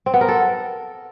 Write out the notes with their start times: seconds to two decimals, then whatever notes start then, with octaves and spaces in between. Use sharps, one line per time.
0.06 C4
0.14 B3
0.21 A#4
0.28 A4